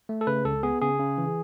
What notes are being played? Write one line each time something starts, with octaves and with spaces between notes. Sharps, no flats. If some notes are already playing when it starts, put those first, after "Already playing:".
A3
A4
C#3 B4
C#2 A4
B3 G#4
C#3 G#4
C#3
E3